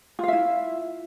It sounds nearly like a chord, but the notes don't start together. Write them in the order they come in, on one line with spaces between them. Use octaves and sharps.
F4 F5 E5 E4